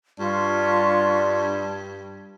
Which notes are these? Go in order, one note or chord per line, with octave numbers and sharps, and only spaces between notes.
G2 D4 F4 C#6